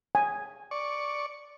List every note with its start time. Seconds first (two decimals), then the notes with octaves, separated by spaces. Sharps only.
0.15 G#5
0.71 D5 C#6